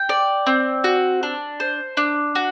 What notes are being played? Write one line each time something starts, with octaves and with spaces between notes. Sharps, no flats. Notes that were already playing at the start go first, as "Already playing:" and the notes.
Already playing: G5
D5
C4
F#4
D4
C5
D4
F#4